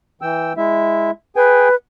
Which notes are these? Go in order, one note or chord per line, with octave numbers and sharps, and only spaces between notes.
E3 G5 E6
G#3 E4 E5
G#4 B4 G5 G#5